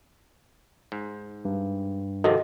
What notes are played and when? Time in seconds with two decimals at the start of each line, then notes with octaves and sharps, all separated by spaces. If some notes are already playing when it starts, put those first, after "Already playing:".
0.92 G#2
1.45 G2
2.24 F2 C3 D#3 F#4 A4 D#5